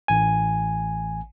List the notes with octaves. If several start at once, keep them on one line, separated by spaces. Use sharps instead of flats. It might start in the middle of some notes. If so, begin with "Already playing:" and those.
A1 G#5